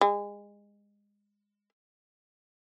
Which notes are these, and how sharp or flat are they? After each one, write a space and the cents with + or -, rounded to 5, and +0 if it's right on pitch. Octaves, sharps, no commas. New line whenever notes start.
G#3 -25